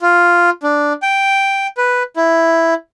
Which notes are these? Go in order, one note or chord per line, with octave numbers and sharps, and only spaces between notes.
F4
D4
G5
B4
E4